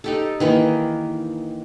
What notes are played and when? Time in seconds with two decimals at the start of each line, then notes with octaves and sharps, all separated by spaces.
0.04 D#4 G4 A4
0.40 D#3 E3 A#3